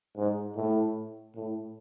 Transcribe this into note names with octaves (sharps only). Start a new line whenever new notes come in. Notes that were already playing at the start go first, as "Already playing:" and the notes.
G#2
A2
A2